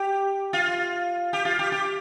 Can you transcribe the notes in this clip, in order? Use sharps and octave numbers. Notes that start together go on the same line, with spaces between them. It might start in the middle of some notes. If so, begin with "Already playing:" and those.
Already playing: G4
F4
G4
F4
G4
G4